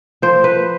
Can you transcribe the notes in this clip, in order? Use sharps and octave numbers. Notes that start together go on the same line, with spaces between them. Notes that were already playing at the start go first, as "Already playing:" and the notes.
F3 C5
B4